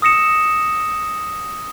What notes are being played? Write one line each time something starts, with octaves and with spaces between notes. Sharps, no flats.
D#6 E6 A#6 C#7 E7